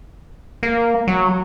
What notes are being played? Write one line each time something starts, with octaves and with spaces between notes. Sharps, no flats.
A#3
F#3